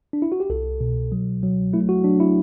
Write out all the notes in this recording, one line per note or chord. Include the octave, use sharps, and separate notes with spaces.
D4
E4
F#4
G4
C2 A4
B2
F#3
F#3
A3 E4
F#4
F#3 D4
E4